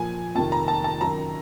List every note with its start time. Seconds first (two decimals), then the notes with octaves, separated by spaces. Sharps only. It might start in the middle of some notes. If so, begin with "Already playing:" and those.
Already playing: A#2 F3 G#5
0.35 F2 C3 D#3 A5
0.52 A#5
0.68 A5
0.84 A5
1.01 F#2 D#3 A#5